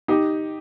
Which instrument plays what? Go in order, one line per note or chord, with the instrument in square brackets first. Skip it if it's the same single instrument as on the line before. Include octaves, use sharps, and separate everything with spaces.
[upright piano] D#4 G4